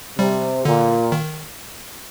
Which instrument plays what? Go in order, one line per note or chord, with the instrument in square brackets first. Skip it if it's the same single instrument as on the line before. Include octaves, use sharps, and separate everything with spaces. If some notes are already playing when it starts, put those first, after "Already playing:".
[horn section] C3 [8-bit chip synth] G3
[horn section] A#2 [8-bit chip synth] D3
[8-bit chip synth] D#3